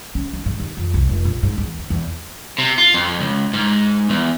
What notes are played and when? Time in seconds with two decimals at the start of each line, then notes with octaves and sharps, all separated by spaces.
0.15 C#4
0.33 D#4
0.46 G#2
0.60 D#2
0.77 F2
0.94 C2
1.09 F1
1.25 A#1
1.43 G#2
1.58 E2
1.78 D3
1.90 E2
2.58 C3
2.78 F4
2.94 F2
3.20 C#2
3.53 G#2
4.10 E2